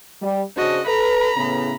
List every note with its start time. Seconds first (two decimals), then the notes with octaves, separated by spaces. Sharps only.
0.21 G3
0.57 C#3 D4 F#4 C5 D#5
0.87 A4 B4 A#5 B5
1.37 A2 C#3 B3